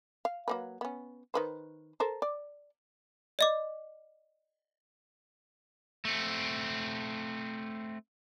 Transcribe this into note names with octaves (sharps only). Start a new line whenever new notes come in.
F5
F#3 A#3 B4
B3 C#4
D#3 B4 C5
A4 A#4 C5
D5
D5 D#5 D6
A3 C4